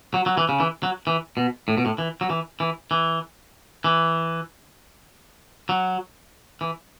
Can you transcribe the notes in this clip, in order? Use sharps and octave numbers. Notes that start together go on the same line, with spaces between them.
F#3
F#3
E3
C#3
E3
F#3
E3
B2
A2
B2
A2
E3
F#3
E3
E3
E3
E3
F#3
E3